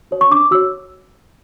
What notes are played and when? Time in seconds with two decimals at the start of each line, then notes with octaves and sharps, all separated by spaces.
0.11 F#4 C#5
0.21 C#6
0.31 D4 D6
0.51 F#4 C#5 E6